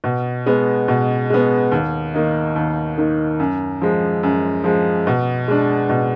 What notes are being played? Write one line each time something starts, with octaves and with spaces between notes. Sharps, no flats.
B2
G#3 B3
B2
G#3 B3
D#2
D#3 A#3 D#4
D#2
D#3 A#3 D#4
F#2
F3 G#3
F#2
F3 G#3
B2
G#3 D4
B2